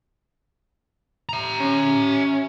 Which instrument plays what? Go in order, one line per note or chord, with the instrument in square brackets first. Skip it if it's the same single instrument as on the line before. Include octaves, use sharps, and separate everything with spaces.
[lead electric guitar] E5 A#5
[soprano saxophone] C#4